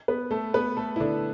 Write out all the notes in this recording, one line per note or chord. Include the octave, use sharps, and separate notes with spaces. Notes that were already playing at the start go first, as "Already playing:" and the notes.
B3 B4
A3 A4
B3 B4
A3 A4
E4
D3 D4